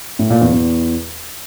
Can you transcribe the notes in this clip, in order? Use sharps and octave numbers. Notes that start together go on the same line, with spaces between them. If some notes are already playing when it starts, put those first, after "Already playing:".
A2
A#2
E2
E2